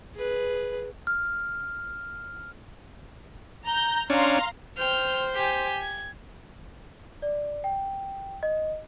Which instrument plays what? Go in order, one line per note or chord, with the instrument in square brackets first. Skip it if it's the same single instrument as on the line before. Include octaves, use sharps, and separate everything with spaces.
[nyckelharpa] G#4 B4
[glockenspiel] F6
[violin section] A#5 G6
[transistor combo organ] C#4 D4 [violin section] F5 A#5 C6
[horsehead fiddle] C5 [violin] G5 F6
[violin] G4 G#5
G#6
[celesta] D5
G5
D#5